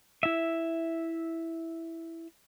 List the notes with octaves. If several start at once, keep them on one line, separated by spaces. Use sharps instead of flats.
E4 E5